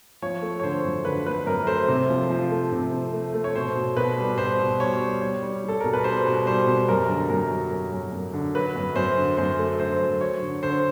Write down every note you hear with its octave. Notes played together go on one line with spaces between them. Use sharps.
F3 C#5
A3
C#5
D3 C5
F#2
D3 B4
A3 B4
F#2 A#4
A3 C5
C3
F3
F3
A3
C3
C3
A3
A3
C#5
B2 C5
B2
B2 B4
G3
B2 C5
B2
G3 C#5
G3
G3 C#5
G3
G3 A4
B2 A#4
B4
G3 C5
B2
G3 C5
B2
F#2 A#4
D3
F#2 A#4
F#3
F#2
F#2
F#2
D3
F#3 B4
F#2
F#2 C5
D3
F#2 C5
A3
D3 C5
F#2
F#3 C#5
D3
D3 C5